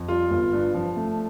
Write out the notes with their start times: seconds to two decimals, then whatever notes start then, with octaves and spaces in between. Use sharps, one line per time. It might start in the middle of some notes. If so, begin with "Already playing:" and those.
Already playing: F2
0.08 G3 F4
0.31 G1
0.53 G2
0.74 F3
0.96 A3